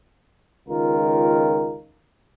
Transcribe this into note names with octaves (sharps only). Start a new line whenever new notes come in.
C#2 D#3 F4 A#4